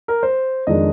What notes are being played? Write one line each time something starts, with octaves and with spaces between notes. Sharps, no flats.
A#4
C5
F2 D#3 G#3 D4 D#5